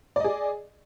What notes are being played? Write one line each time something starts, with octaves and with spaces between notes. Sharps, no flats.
G#4 D5 D#5